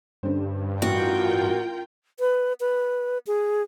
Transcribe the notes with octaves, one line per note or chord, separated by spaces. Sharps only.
G2 D3 C#4 C5
A1 F4 F#4 A#4 G5
B4
B4
G#4